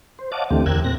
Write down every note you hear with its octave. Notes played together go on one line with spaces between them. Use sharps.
C5
C#5 D#5 F5 F#5 A5 D6
D2 D3 E3 A3 C4 G4
E2 A#4 G5 E6 F#6 G#6
A#2 C4 F#6 A#6